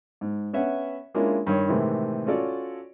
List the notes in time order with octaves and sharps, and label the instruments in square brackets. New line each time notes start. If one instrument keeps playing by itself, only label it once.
[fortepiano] G#2
B3 C#4 E5 F#5
G#3 A#3 C#4 D4 E4 F4
G2 D#3 C#5
A2 C3 D#3 E3 G#3
C#4 F4 F#4 A4 C#5 D5